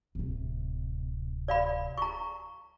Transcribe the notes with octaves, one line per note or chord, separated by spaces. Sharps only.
D1 C3
D5 F5 B5
A#5 C#6